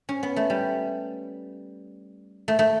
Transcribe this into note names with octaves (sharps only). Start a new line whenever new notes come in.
C#4
B3
A3
G3
A3
A3